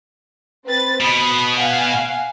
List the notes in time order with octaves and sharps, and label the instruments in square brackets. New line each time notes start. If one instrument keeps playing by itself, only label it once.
[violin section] C4 B4 A6
[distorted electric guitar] B2 [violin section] B5 D#6
[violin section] F5 F#5 G#5